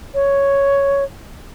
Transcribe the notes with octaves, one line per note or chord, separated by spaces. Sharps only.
C#5